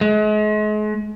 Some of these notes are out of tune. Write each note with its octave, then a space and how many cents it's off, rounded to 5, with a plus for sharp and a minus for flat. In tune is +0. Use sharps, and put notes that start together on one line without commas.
G#3 +40